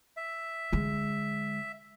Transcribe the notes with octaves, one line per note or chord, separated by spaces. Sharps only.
E5
D3 G#3